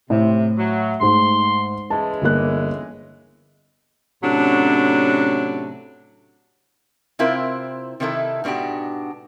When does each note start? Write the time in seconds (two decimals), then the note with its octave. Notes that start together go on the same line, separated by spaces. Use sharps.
0.10 A2 C3
0.57 F#3
1.00 G#2 G#3 A3 C6
1.90 C#3 E3 G#3 A5
2.22 G1 A#3 F#6
4.24 A2 C3 F#3 C#4 D4
7.19 C3 C4 E4 F4 A#4
8.00 C3 D#3 D#4 E4 A4
8.44 G#2 B2 D4 F#4 G4